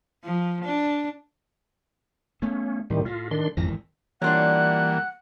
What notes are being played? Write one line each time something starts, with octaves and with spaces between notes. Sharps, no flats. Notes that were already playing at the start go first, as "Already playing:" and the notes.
F3
D4
A3 B3 C#4
C2 A2 D#3 G3
A2 F4
D#3 D4 C6
G#1 F2 D#3 E3 A#6
E3 G3 A#3 D4 F4 C#5 F#5 F#6